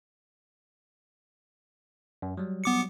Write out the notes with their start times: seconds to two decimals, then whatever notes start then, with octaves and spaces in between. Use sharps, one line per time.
2.22 F#2
2.37 F#3 G3
2.64 B3 D6 C#7